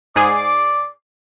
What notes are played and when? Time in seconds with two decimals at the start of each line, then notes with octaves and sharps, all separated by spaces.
0.16 G#2 G#4 D5 D6 C7